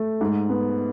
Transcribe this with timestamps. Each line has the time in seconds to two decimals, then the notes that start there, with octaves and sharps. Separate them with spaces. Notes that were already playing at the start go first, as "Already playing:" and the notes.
Already playing: A3
0.21 G#2
0.50 B3